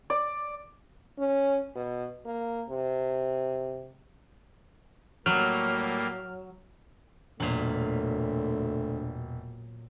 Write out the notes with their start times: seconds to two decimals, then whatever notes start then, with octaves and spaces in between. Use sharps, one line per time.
0.10 D5
1.19 C#4
1.75 B2
2.26 A#3
2.70 C3
5.26 A2 F#3 G3 A#3 F6
7.40 E1 D2 A#2 F#3 A3 F#7